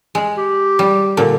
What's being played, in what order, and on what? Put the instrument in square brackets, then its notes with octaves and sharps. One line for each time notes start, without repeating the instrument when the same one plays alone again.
[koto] G#3
[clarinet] G4
[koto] G3
A#2 D3